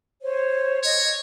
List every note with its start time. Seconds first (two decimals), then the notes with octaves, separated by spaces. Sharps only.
0.22 C5 C#5
0.83 C#5 D#5